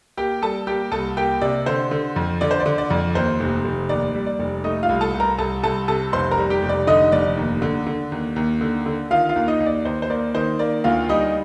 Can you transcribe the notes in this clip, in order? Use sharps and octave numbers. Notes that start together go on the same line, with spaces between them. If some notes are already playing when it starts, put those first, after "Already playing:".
A#3 G4 G5
G3 A4 A5
A#3 G4 G5
C2 A4 A5
A#3 G4 G5
C3 D5
D3 C5
D3
F2
D3 D5
C5
D5
D3
D5
F2
D#2 C5
F1
F1
D#2 D5
G3
D5
F1
A3 D#4 D#5
F4 F5
C2
A4 A5
C2
A#4 A#5
C2 A4 A5
C2 A4 A5
C3 A4 A5
F1 C5 C6
A#4 A#5
G3
G4 G5
F1
D5
D3 D#4 D#5
F1 D5
D#2
D3
D3
D#2
D#2
D3
D3
D#3 F4 F5
F4 F5
D#2
D#4 D#5
D#2
D5
D#2 C5
C5
A#3 D5
D#3 C5
A#3 D5
D2 F4 F5
G3 D#4 D#5